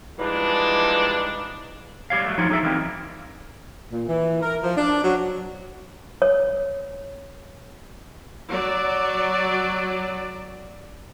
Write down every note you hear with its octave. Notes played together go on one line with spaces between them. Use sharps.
E3 F3 G3 G#3 D4 D#4
G3 G4 C#5 F5
F#3 A3
F3 D#4 F4 C#5
F#3 D#4 G#4 A4 E5
E3 F#3 G3 A#3 C4 D#4
A#2
E3
A#4
F3
D4
F#3
C#5
F#3 D5